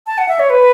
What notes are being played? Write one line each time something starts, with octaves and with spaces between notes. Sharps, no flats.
A5
F#5
E5
C#5
B4